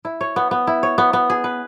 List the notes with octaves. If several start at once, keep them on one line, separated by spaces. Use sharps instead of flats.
E4
C#5
B3
B3
E4
C#5
B3
B3
G#4
B4